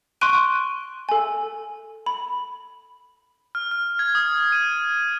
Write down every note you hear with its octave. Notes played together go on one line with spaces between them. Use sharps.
C6 C#6 F#6 D7 D#7
A4 G#5
B5
F6
F6
G#6
D#6
D#7